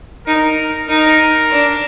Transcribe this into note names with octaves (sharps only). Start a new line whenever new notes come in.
D#4 A#4
D#4 A#4
D4